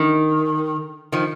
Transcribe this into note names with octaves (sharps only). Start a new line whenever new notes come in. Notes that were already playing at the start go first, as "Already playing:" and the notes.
Already playing: D#3
D#3 F3